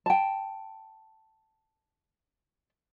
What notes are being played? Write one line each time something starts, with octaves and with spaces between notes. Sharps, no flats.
G5 A5